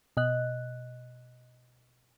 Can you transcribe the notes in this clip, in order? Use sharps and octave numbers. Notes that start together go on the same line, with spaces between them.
B2 D#5 F#6